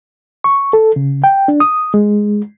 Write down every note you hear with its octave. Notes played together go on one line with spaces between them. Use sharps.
C#6
A4
C#3
G5
D4
D#6
G#3